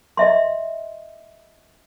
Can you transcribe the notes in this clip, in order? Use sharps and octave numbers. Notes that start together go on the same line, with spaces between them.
D#5 E5 C6